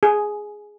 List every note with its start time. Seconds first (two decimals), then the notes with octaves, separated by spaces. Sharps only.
0.03 G#4